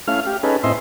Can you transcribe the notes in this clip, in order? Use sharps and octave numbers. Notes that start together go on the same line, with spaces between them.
A3 C#4 E4 F5 F6
G4
C#4 D#4 G#4 A4 B4
A2 C4 E4 D#5 E5 C6